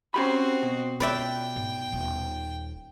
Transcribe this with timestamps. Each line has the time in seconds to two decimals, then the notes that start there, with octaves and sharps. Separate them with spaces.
0.14 C4 C#4 F#4 G4 B5
0.63 B2
1.00 F4 B4 D5 E5 G5
1.56 G#2
1.92 D#1 D#4